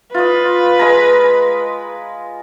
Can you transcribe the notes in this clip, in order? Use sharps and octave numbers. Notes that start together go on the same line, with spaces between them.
F4 B4 D#5
G#3 A#5